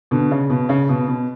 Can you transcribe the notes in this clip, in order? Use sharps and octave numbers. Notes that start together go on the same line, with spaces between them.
B2 D3
C#3
B2
C#3
B2
B2